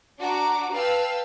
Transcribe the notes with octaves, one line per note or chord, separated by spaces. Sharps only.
D4 F#4 A#5 D6
B4 F5 G5 A5 E6